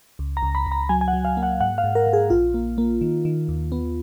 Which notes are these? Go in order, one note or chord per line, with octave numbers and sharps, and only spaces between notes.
C#2
A#5
C#2
B5
C#2
A#5
F#3 G#5
G#5
F#5
F#3
F5
A#3
F#5
G#2 F#5
F5
G#2
A#4
G#2
G#4
A#1 F4
A#3
A#3
D#3
D#3
D#2
B3